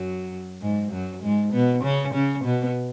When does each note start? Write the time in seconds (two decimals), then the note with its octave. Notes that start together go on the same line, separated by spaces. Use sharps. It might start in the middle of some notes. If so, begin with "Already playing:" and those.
Already playing: F#2 F#3
0.62 G#2 G#3
0.92 F#2 F#3
1.22 G#2 G#3
1.53 B2 B3
1.83 C#3 C#4
2.14 C#3 C#4
2.44 B2 B3